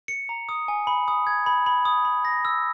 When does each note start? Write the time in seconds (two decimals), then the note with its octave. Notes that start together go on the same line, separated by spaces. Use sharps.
0.08 C#7
0.29 A#5
0.49 D#6
0.68 G#5
0.87 B5
1.08 D#6
1.27 G#6
1.46 B5
1.66 B5
1.85 D#6
2.05 B5
2.25 A#6
2.45 E6